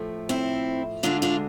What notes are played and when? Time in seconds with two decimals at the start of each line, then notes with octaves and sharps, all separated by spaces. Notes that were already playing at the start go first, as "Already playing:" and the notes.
Already playing: A2 F3 A3
0.29 C4 E4
1.03 D2 D3 G#3 D4 F4
1.22 D4 F4